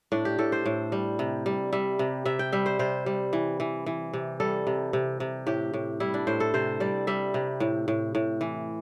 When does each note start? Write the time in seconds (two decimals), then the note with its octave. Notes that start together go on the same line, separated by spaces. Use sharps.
0.12 A2 D4
0.25 G4
0.39 A2 A4
0.52 C5
0.66 A2
0.92 G3
1.19 C3
1.46 G3
1.72 G3 E5
1.99 C3
2.25 C3 E5
2.39 G5
2.52 G3 E5
2.66 C5
2.79 C3 C5
3.06 G3
3.33 E3
3.60 E3
3.86 E3
4.13 C3
4.40 G3 A4
4.67 C3
4.93 C3
5.20 C3
5.47 A2 G4
5.74 A2
6.00 G3 E4
6.14 D4
6.27 A2 C5
6.40 A4
6.54 C3 C5
6.80 G3 D5
7.07 G3 E5
7.34 C3
7.60 A2
7.88 A2
8.15 A2
8.41 E3